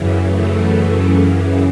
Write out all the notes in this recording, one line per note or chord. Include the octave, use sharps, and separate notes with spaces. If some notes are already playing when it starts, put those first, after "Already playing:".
Already playing: F#2 C#3 E3
A3